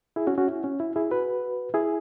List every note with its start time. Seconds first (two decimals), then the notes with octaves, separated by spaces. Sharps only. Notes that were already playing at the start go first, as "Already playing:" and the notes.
0.16 E4 G#4
0.27 C#4 F#4
0.38 C#4 F#4
0.48 E4
0.64 C#4
0.80 E4
0.96 E4 G#4
1.11 F#4 B4
1.74 E4 G#4